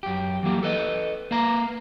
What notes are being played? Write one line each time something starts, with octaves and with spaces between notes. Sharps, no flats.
F#2 G4
E3 F#3 A#3 G4
A4 B4 D#5
A#3 B4 A#5